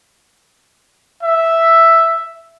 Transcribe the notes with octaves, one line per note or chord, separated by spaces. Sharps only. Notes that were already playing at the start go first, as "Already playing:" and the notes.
E5